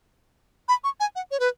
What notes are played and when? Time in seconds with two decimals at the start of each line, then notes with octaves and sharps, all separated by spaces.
0.69 B5
0.84 C#6
1.00 G#5
1.16 F#5
1.31 C#5
1.40 B4